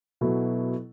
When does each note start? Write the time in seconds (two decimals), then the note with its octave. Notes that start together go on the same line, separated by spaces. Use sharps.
0.21 B2 F#3 B3 E4 A4